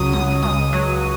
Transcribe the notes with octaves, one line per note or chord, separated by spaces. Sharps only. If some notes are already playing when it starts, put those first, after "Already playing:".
Already playing: C#2 F#3 D#6
C#2 D#6
C#2 D#6
F#3